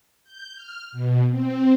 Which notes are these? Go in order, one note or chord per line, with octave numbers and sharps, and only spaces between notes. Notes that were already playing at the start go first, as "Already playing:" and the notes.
G6
F6
B2
C4